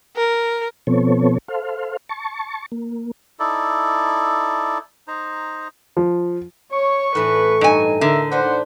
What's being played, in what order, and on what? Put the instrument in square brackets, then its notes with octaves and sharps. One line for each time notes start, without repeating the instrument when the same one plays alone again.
[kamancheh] A#4
[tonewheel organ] B2 F3 B3 C4 A4 C#5
A4 C5 F5
A5 C#6
A#3
[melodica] D#4 E4 A4 D5
D#4 C5 A#5
[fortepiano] F3
[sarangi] C#5 [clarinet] C#6
[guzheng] A2 E3 [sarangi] B4
[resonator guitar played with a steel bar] G2 G#5 [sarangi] D#4
[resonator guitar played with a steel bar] D3 [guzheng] D#4 [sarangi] A#4 [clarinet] E5
[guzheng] D4 B4 [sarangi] C5 [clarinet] F#5